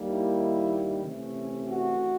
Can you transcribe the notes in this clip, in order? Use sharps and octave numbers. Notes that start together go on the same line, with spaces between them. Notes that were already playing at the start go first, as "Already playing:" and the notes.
Already playing: D#2 D#3 G3 A#3
E4
C3 E3 A3 C#4
F#4